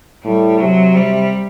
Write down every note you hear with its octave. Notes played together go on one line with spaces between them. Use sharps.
A2 G3
C3 F#3
C3 G3